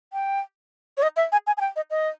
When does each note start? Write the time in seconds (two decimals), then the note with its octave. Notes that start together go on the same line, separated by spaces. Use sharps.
0.13 G5
0.97 C#5
1.03 D#5
1.17 E5
1.32 G#5
1.47 G#5
1.57 G#5
1.61 G5
1.76 D#5
1.91 D#5